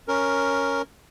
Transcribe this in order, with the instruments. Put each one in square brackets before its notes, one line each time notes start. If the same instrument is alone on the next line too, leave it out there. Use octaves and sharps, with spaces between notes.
[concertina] C#4 A#4